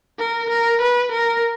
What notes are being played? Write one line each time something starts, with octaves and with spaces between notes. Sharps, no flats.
A#4
A#4
B4
A#4